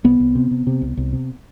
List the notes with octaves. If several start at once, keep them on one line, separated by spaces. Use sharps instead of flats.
C2 B3
C2
C3
C3
C3
C2
C2
C3